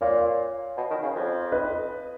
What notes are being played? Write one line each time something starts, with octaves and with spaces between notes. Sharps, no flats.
A#2 C#5 F5
B2
D#3
C#3
F2
B4 D#5